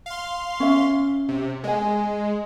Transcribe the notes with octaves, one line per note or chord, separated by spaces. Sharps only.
F5 C6
C#4 E5
C3
G#3 D#5 G#5